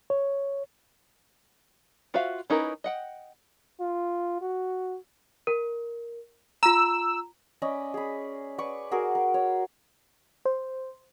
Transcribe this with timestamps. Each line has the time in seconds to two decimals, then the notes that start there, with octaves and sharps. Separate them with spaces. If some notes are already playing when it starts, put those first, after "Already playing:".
0.10 C#5
2.14 F4 F#4 C5 E5 F5
2.50 C#4 D#4 E4 A#4 B4
2.84 D#5 F#5 G5
3.80 F4
4.42 F#4
5.47 A#4
6.63 F4 A#5 E6
7.62 C#4 D5 D#5 B5
7.94 G#4 B5
8.58 B4 D5 C#6
8.91 F#4 G#4 A#4
9.15 A#4
9.34 C#5
10.45 C5